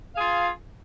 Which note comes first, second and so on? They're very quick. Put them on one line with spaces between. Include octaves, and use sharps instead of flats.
F5 G#4 F4